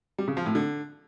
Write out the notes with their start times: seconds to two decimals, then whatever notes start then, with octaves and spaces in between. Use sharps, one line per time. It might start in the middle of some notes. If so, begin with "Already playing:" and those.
0.18 G3
0.28 C#3
0.37 F3
0.46 A2
0.55 D3